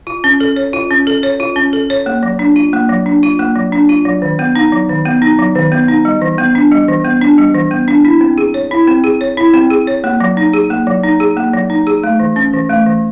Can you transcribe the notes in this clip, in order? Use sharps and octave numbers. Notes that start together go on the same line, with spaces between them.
F4
C#4
A4
C#5
F4
C#4
A4
C#5
F4
C#4
A4
C#5
A#3
F#3
D4
F4
A#3
F#3
D4
F4
A#3
F#3
D4
F4
F#3
D#3
B3
D#4
F#3
D#3
B3
D#4
F#3
D#3
B3
D#4
G3
E3
B3
D4
G3
E3
B3
D4
G3
E3
B3
D4
E4
C4
G#4
C#5
E4
C4
G#4
C#5
E4
C4
G#4
C#5
A#3
F#3
D#4
G#4
A#3
F#3
D#4
G#4
A#3
F#3
D#4
G#4
A3
E3
C#4
E3
A3
E3